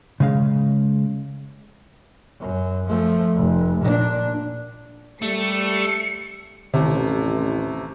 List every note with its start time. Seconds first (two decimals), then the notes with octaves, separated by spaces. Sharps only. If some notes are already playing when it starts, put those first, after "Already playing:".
0.20 C#3 G#3 F5
2.40 F#2
2.88 F3 A3
3.36 F1
3.81 A#2 D4
5.22 G3 A3 C#7
6.74 A1 D#2 C3